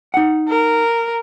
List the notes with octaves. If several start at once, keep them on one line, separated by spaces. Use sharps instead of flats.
D#4 F#5
A#4